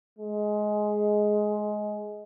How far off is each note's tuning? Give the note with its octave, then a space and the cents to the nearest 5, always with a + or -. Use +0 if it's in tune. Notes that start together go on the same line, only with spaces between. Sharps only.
G#3 +15